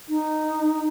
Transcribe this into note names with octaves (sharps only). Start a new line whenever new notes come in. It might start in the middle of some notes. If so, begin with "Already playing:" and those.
D#4